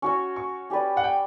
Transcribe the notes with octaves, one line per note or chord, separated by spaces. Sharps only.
C#4 F#4 C#5 C#6
C#6
C#4 G4 B4 D5
F#5
G5